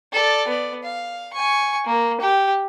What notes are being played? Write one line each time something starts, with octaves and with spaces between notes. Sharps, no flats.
A4 D5
B3 D5
F5
G#5 C#6
A#3
G4